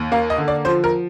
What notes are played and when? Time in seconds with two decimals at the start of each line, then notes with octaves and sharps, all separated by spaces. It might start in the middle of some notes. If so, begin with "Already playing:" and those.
Already playing: D#2
0.12 A#3 F5
0.30 D#5
0.38 D3
0.48 D5
0.65 F3 C5
0.84 A#4